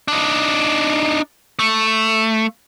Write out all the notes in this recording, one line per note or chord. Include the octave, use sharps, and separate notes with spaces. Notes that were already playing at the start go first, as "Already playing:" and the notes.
D4 D#4
A3